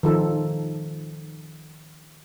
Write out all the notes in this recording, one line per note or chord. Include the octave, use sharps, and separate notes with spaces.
D#3 F3 A4